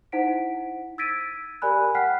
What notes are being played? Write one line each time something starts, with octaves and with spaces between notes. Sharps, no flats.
D#4 E4 C5 F#5 B6 D7
E6 G#6 A6 B6 D7 D#7
G4 A#4 D5 G#5 B5 F#6
F#5 G5 F6 F#6 B6 C7